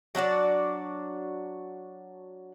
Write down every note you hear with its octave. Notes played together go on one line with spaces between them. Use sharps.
F#3 D4 F#4 D5